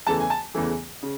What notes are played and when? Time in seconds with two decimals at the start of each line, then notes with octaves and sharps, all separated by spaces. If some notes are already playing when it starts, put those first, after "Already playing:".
0.07 E2 C#3 E3 A3 A5
0.20 G#5
0.30 A5
0.54 E2 C#3 E3 A3
1.03 C#3